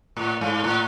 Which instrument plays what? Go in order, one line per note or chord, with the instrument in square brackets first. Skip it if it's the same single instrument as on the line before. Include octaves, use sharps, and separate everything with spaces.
[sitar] A2
G#2
A2